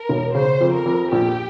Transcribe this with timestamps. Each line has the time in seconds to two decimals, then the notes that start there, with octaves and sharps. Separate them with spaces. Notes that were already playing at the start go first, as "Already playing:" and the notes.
Already playing: A#4
0.09 E1
0.35 C#3 C5
0.61 F2
0.73 A#4
0.86 F2
1.12 A#1 G4